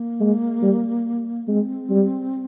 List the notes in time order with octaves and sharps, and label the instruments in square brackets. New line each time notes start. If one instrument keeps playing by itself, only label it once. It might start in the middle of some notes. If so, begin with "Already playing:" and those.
Already playing: [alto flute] A#3
[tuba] G#3
G3
[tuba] G#3 [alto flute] C4
[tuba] G3